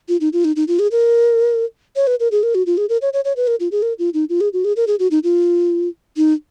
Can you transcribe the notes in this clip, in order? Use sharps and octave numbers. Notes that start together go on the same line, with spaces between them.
F4
D#4
F4
D#4
D#4
F4
G#4
A#4
C#5
B4
A#4
G#4
A#4
F#4
F4
G#4
A#4
C#5
C#5
C#5
B4
A#4
F4
G#4
A#4
F4
D#4
F4
G#4
F#4
G#4
A#4
G#4
F#4
D#4
F4
D#4